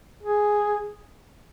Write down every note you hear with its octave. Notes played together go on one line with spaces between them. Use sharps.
G#4